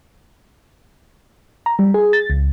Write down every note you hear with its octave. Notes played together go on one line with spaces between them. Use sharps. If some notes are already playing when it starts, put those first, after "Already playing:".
A#5
G3
G#4
A6
C#2